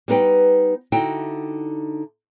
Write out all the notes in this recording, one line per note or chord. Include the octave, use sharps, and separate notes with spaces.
G3 B3 D#4 B4 G5
D3 D#4 E4 F#4 E5 G5